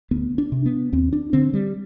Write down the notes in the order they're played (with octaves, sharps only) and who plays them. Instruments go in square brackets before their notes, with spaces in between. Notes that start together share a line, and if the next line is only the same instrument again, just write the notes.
[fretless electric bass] D2 B3
D4
C3
B3
D#2 C4
D4
D3 C4
G3